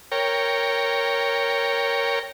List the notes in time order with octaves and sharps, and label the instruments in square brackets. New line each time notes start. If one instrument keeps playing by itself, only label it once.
[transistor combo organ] A#4 C#5 G5